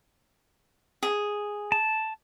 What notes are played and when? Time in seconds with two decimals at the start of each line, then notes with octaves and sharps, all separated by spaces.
1.03 G#4
1.72 A5